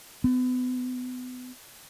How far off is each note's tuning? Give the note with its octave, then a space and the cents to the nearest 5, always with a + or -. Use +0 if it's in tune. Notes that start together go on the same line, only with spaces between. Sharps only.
B3 +35